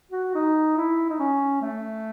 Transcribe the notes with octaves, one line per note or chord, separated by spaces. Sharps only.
F#4
D#4
E4
D#4
C#4
A3